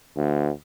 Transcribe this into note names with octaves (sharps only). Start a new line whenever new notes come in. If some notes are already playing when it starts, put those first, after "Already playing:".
D2